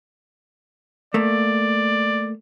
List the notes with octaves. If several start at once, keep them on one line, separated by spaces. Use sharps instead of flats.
A3 A#3 D5